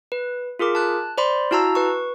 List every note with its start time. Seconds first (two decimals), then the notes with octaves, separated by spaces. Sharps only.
0.12 B4
0.59 F4 G#4 A#4 D6
0.75 A5 F#6
1.18 C5 D5 B5 C6
1.51 E4 F#4 A5 A#5 E6
1.75 B4 C#6